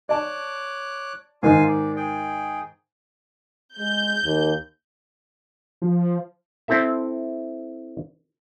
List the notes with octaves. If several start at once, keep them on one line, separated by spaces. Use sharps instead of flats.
C#5 D5 A5 D6 F#6
G#2 D#3 D#4 F4 F5 G#5
D5
G#4 G5
G#3 G6
D#2
F3
C4 E4 A4 E5